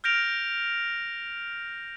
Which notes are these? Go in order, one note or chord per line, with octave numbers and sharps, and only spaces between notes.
F6 G6 A#6 D7 F7